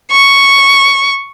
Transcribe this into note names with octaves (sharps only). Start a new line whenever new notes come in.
C#6